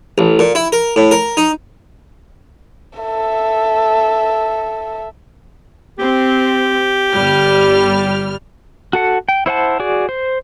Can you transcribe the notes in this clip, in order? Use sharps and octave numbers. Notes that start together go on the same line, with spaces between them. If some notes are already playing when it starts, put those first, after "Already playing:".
A1
A#2
E4
A#4
A2
A#4
D#4
A4 E5
C4 G4
G1 G3 F6
F#4 A4 F#5
G5
E4 C5 F#5 A5
F#4 G#4 D5
C5